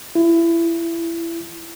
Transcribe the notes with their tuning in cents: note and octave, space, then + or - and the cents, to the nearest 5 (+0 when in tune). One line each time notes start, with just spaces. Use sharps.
E4 +25